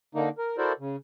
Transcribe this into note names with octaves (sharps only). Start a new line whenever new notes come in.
D3 A#3 D#4
A#4
E4 F#4 A4 A#4 C5 D5
C#3